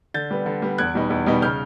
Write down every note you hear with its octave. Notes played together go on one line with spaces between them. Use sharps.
D3 G6 A6
G3 B3
D3
G3 B3
E2 F#6 G#6
B2 G3 B3 D#4
E2
B2 G3 B3 D#4
C#3 F6 G6